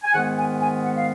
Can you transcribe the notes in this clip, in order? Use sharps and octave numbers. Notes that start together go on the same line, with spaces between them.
G#5
G#2 D#3 G#3 B3 F#5
G#5
G#5
F#5
F5